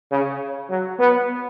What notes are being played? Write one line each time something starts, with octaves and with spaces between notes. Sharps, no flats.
C#3
F#3
B3